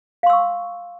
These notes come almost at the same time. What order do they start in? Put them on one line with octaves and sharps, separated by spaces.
F5 C6 E6 C#6